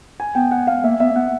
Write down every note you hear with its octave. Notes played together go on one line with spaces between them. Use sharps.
G#5
B3 G5
F#5
F5
A#3 E5
B3 E5
A#3
B3 F#5